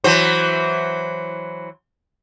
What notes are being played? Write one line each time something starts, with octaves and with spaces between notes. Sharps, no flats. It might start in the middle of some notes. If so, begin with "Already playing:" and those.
E3 F#3 C5